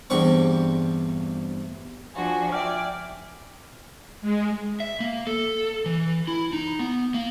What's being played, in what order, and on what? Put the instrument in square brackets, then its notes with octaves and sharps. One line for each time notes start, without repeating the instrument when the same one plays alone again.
[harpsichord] E2 G2 C4 C#6
[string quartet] F3 D4 F#4 [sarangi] G#5
[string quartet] D5 [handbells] E5 G5 F6
[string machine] G#3
[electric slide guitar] E5
A#3
A4
E3
E4
D#4
B3
A#3